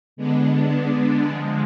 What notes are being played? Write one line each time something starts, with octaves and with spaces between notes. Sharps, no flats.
D3 G#3 B3 D4
D3 F3 G#3